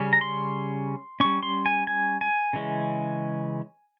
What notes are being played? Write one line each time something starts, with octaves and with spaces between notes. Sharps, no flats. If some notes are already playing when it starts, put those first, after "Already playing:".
Already playing: C#3 G3 C#4
A#5
C6
G3 C#4 C#6
C6
G#5
G#5
G#5
C#3 E3 G#3 C#4